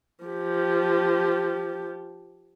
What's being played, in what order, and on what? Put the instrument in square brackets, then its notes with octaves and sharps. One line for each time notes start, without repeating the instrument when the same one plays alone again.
[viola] F3 G4